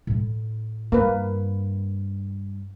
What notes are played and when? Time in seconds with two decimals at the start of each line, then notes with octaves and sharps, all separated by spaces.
0.07 A2 E4
0.92 G2 A#3 B4